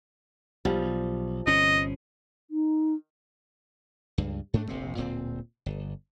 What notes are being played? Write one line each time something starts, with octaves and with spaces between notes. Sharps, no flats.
B1 F3 G3
G1 C3 C#4 D#5
D#4
C#2 G2
G#2 A3 D4
F1 A#1 C3 C4
D1 A#2 B3 C4
G1